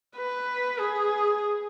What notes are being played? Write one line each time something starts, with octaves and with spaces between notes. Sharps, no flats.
B4
G#4